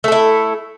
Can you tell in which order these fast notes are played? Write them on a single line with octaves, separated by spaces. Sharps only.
A3 A4 E4